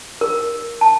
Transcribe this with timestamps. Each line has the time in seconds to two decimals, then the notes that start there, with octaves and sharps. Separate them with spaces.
0.21 A#4
0.81 A5